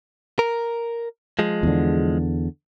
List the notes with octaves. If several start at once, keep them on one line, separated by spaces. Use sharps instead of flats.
A#4
F3 G#3
E2 D3